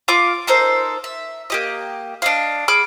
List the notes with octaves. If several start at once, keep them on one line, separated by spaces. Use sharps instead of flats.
F4 F5 C6 D6
D#4 A4 A#4 C5
E5
A#3 G4 D#5
D4 D#5 F5
G#4 B5 D6 F6